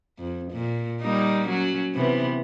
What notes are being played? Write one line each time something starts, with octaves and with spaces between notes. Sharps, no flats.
F2
A#2
G3 A#3 D#4
F#3 C#4
C3 E3 B3